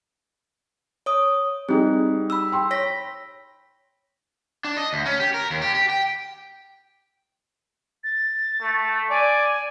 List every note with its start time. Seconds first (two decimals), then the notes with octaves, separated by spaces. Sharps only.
1.06 C#5 D#6
1.69 G3 C4 D#4 G#4
2.30 B5 E6
2.52 G5 C6
2.71 C#5 A#6 B6
4.64 D4
4.77 D#5
4.93 D2
5.06 C#4
5.20 G4
5.34 A#4
5.50 D#2
5.62 G4
5.75 G4
5.89 G5
8.04 A6
8.61 A3
9.10 D5 G#5